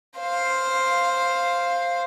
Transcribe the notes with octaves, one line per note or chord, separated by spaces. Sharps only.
C5 F5